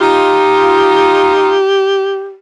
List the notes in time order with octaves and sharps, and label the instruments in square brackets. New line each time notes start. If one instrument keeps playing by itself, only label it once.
[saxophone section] D#4 F4 [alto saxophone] G4